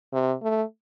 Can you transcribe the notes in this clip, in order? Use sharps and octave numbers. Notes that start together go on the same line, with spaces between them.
C3
A3